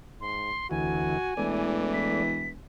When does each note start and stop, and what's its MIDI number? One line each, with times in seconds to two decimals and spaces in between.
0.21 0.51 44
0.21 0.70 84
0.71 1.18 38
0.71 1.18 52
0.71 1.37 66
0.71 1.73 80
1.37 2.61 28
1.37 2.58 52
1.37 2.23 57
1.37 2.23 74
1.94 2.49 95